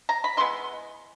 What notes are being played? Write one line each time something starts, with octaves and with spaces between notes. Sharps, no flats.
A#5
B5
E3 G#3 B3 C6